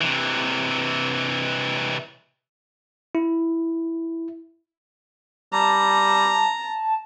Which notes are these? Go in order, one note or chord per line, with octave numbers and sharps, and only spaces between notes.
C3 E3
E4
G3 A5 A#5